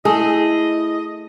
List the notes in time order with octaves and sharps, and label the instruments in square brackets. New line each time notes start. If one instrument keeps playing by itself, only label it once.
[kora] A3 [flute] E4 [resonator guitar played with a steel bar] G#4 [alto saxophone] D#5